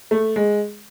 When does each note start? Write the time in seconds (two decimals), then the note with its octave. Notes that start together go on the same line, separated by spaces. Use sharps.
0.11 A3
0.36 G#3